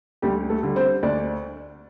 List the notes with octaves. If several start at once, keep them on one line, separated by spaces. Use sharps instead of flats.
D2 G3 G4
A3 A4
D3 G3
C4 C5
D2 D4 D5